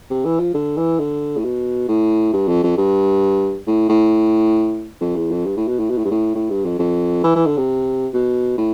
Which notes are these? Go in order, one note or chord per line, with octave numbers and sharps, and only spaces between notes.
C3
E3
F3
D3
E3
D3
A2
B2
A2
G2
F2
F2
G2
A2
A2
F2
E2
F2
G2
A2
B2
A2
B2
A2
G2
A2
A2
G2
F2
F2
E3
E3
D3
C3
B2
A2